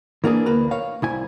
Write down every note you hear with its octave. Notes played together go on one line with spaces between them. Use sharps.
E3 A#3 D4 G#4
D2 A#3 B4
C#5 F5
C2 E4 G#5